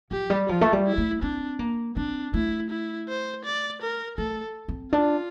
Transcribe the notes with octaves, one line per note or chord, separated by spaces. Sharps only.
F3 G4
G3
F3 F4
A3
G3
E4
A3
C4 D4
A#3
C4 D4
A3 E4
E4
C5
D5
A#4
A3 A4
C4
D4 F4